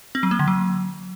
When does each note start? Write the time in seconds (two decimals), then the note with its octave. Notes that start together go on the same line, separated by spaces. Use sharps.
0.15 C4
0.23 F#3
0.31 A#3
0.39 D3
0.48 F#3